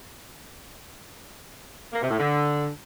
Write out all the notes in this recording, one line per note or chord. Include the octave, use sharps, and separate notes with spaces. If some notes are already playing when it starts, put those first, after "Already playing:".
A#3
C3
A2
D3